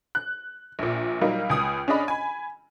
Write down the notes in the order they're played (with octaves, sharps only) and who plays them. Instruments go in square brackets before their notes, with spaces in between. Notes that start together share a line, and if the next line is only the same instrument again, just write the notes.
[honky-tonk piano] F#6
A#1 A#2
F#3 G3 A#3 D#4
C#2 G#5 D#6
C#4 D4 G#4 D#5 B5
G#5 B5